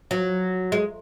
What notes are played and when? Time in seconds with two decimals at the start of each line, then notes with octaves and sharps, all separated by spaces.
0.11 F#3
0.72 G#3